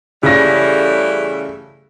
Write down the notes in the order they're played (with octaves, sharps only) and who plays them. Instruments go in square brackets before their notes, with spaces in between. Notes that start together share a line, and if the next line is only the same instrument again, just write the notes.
[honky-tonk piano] C#3 A#6 [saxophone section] E3 G3 A3